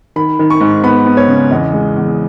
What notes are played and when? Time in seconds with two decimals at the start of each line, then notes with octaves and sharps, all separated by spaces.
0.16 D#3 B5
0.39 D#3
0.50 C#6
0.61 G#2
0.83 B3 B5
1.06 B3
1.17 C#5
1.28 C#3
1.51 E2 D#5
1.73 G#3
1.96 E2